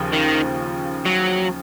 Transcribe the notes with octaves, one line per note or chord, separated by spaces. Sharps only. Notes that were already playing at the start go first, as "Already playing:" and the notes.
Already playing: D#2 C#3 F3
D#3
F#3